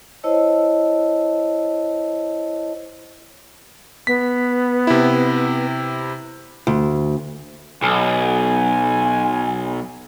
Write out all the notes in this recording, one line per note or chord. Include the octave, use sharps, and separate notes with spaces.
E4 C5 C#5 D#5 A5 E6
B3 B6
C3 E4
D2
B1 G#5